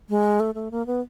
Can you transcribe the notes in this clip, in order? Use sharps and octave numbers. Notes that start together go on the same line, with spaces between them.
G#3
A3
A3
A#3
B3